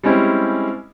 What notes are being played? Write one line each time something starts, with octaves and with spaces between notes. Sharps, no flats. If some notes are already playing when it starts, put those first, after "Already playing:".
G3 G#3 C4 C#4 E4 G4